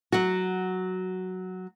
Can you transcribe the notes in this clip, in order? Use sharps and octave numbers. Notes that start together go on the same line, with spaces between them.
F#3 F#4